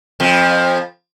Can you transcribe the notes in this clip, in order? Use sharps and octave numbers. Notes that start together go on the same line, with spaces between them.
F2 F3